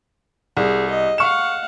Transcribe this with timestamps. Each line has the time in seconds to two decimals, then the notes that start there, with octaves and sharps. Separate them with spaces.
0.57 C2 G#4
0.90 D#5
1.18 F5 F#5 C#6 E7